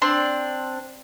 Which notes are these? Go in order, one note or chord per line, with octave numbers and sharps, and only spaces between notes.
C4 D4 C6